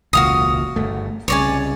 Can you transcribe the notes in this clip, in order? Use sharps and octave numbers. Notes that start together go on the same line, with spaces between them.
E1 C#2 A#2 F#4 F5 D#6
G1 A3
C2 C#3 C#5 D5 G#5